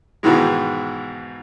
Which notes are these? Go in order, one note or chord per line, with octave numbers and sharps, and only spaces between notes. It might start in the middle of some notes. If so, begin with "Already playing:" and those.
G#2 B2 D#3 E3 G#3